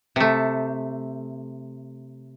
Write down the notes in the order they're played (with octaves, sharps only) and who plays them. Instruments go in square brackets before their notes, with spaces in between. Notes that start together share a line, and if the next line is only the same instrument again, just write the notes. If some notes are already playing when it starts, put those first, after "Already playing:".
[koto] C3 A3